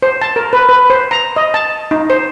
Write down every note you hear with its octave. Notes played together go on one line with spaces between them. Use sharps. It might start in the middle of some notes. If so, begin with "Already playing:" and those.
C5
A5
A#4
B4
B4
C5
A#5
D#5
A5
D#4
C5